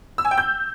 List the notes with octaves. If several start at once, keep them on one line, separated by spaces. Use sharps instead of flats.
E6
G#5
G5
G6